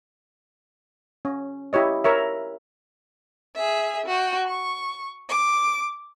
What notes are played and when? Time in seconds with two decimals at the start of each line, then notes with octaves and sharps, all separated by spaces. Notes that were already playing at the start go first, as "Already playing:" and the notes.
1.25 C#4
1.73 E4 G4 C#5 D#5
2.04 A#4 C#5 E5
3.56 G#4 E5
4.06 F#4 G5
4.47 C#6
5.29 D6